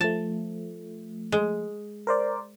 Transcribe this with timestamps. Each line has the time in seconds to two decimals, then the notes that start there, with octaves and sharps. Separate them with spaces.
0.01 F3 A3 A5
1.32 G#3
2.07 A#4 C5 D5